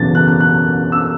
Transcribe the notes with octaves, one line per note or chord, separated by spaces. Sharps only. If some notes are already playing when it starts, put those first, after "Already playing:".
Already playing: F#1 E2 B2 A6
F#6
F#6
F#6
E6